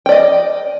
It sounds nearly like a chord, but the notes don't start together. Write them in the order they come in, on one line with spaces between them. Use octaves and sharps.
G5 D5 D#5